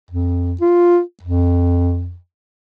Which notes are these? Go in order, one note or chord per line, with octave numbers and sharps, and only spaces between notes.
F2
F4
F2